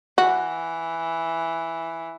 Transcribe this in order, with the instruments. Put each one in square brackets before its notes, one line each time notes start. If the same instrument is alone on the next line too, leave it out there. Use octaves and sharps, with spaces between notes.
[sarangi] E3 [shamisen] F#4